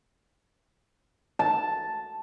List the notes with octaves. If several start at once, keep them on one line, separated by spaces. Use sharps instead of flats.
A5